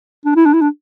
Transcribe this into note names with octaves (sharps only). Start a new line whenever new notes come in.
D4
E4
D4
E4
D4